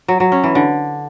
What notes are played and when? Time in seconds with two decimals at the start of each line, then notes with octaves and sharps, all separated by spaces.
0.08 F#3
0.20 F#3
0.32 C#4
0.44 E3
0.55 D3